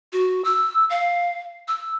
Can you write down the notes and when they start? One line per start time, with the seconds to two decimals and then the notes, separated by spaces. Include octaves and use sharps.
0.13 F#4
0.45 E6
0.90 F5
1.68 E6